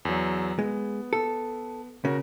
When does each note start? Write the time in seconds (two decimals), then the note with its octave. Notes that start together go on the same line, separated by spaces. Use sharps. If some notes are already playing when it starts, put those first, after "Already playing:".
0.05 E2 F#3
0.59 G#3 B3
1.13 A4
2.05 C#3 F#4 A#4